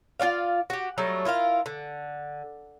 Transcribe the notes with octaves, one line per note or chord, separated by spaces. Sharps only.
F4 F#4 D5 F5
F#4 G4
F#3 G3 A3
E4 F4 A#4 F5
D3